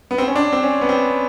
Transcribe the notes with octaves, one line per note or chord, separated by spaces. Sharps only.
B3
C4
C#4
D4
C4
C#4
B3
C4